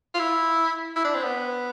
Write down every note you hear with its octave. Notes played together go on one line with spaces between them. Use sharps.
F4
E4
E4
D4
C4
B3